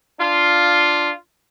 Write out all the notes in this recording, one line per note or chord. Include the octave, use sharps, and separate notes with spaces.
D4 F4